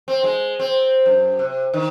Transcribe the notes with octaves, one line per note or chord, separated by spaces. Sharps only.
C4
G#3
C4
F#2
C3
D#3